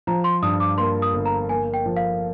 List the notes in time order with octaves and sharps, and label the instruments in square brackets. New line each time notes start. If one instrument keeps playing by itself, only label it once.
[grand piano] F3 [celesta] A#5
[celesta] C6
[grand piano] G2 [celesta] D#6
[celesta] D6
[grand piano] A#3 [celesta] C6
[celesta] D#6
[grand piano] G1
[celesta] A#5
[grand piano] A#3 [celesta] G#5
[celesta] G5
[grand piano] F3
[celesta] F5